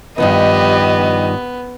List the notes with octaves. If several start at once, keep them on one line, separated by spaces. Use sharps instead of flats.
G2 D#3 F3 B3 G4 D#5